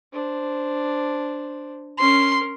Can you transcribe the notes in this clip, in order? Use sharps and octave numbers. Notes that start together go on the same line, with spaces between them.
D4 C5
C#4 A#4 C6